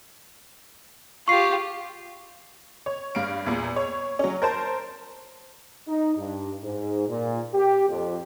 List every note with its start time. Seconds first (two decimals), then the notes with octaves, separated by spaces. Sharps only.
1.28 F4 G4 C#6 C7
2.86 C#5
3.15 G2 F5 D7
3.46 E2 A#2
3.76 C#5
4.19 F#3 C#4
4.42 A#4 C5 A5
5.88 D#4
6.18 G2
6.64 G#2
7.08 A#2
7.54 G4
7.89 F2